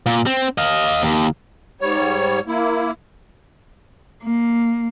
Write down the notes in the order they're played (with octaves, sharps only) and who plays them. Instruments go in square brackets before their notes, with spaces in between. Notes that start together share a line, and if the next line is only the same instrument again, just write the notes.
[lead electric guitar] A#2
C4
D#5 F5
D#2
[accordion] G#2 G3 C#5
A#3 E4
[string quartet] A#3